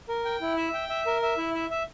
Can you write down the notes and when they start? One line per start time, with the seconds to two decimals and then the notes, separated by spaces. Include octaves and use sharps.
0.09 A#4
0.25 G5
0.41 E4
0.57 E5
0.74 G5
0.89 E5
1.06 A#4
1.22 E5
1.38 E4
1.55 E5
1.70 E5